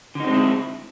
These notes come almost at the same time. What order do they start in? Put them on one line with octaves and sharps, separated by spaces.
D3 D#4 C4 G#3 E4